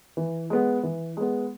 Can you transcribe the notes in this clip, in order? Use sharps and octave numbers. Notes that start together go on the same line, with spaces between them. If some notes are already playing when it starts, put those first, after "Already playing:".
E3
G#3 B3
E3
G#3 B3